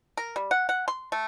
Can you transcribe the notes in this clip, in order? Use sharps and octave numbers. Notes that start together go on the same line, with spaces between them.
A#4
G3
F#5
F#5
C6
A3